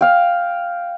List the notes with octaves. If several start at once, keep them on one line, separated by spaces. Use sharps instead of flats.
F5 G5